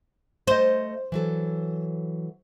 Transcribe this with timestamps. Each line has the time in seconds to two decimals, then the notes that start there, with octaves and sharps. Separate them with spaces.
0.47 A3 C5 D#5
1.12 E3 F#3 A4